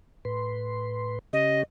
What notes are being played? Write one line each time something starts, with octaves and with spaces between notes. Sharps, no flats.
A2 B4 C6
C#3 C#4 G4 D#5